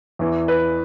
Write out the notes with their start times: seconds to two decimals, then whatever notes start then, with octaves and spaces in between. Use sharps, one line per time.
0.19 E2 E3
0.48 B4